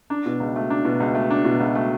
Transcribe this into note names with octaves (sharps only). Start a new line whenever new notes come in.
D4
B2
C#2
A3
D4
B2
C#2
A3
D4
B2
C#2
A3